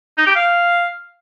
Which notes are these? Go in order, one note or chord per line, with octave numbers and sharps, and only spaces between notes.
D#4
G4
F5